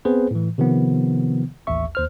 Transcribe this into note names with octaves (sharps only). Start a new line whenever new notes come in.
B3 C4 G#4 B4 C5
A2 E3
C3 D#3 F3 B3
A1 D#2 E5 C#6
D#2 C5 F6